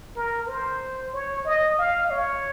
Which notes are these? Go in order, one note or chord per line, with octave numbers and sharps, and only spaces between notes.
A#4
C5
C#5
D#5
F5
C#5